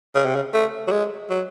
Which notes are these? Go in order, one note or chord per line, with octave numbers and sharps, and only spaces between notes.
C#3
C3
C#3
A3
F#3
G#3
F#3